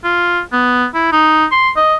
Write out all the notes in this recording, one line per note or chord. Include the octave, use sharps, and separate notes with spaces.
F4
B3
E4
D#4
C6
D#5